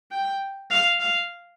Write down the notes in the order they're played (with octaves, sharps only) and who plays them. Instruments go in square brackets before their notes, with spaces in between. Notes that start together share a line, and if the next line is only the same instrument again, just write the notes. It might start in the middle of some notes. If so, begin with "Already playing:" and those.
[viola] G5
F5
F5